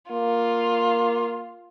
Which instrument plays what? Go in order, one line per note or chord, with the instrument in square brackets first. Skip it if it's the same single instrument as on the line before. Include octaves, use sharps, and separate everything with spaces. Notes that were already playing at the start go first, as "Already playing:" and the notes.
[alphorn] A#3 [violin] F4